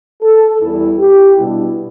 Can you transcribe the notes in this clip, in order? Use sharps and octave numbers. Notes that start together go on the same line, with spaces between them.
A4
E2 E3 G3 E4
G4
B2 G3 D4 E4